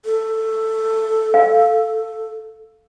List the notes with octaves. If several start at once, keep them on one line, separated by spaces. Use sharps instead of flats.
A4
F5